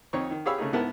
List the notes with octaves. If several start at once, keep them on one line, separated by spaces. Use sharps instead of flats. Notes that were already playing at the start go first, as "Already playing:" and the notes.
F2 D#4 C#5 C#6
D#3
G4 G#4 C#5 F5 B5 E6
C#3 A3 D#4 G#4
G#2 B3 E4 A#4 B4 A5